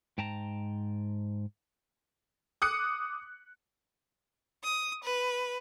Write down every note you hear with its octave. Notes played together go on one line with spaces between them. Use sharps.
G#2 G5 A5 A#5
D6 D#6 F#6 C#7
D#6
B4